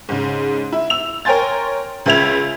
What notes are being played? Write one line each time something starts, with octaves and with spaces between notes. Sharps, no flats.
G#2 C#3
E4
E6 F7
A#4 C#5 G5 G#5 C6 A6
C#2 C#3 B4 E5 G#6 F7